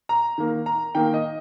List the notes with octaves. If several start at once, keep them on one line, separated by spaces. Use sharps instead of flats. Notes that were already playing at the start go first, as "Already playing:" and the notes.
A#5
D#3 A#3
A#5
D#3 A#3 G5
D#5